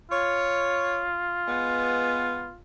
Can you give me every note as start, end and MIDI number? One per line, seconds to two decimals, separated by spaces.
0.11 2.60 65
0.11 1.03 73
1.46 2.50 56
1.46 2.50 59